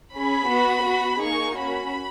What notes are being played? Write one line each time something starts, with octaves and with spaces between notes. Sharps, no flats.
C#4 G#4 B5
B3 F#4
B3 F#4
A#3 D#4 G#4 C#6
C#4 F#4 B5